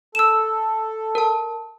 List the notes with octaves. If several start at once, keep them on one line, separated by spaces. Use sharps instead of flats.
A4 E6 E7
A#4 A5